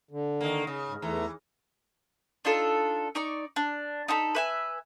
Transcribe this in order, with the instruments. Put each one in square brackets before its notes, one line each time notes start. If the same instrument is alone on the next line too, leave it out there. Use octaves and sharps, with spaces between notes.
[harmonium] D3
[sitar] D#3 A#3
C#3
[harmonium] G#2
[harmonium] E2 A3 A#5 [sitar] E3
[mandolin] D4 D#4 F4 A4
D#4 D5 C#6
D4
D#4 A4 A#5 B5
B4 E5 G#5